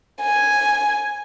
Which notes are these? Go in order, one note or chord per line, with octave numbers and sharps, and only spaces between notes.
G#5